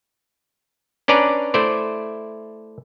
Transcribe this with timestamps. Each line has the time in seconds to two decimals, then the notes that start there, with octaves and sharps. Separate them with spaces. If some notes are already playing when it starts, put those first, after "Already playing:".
1.08 C#4 D4 B4 D5 A#5
1.54 A3 E4 C5 D5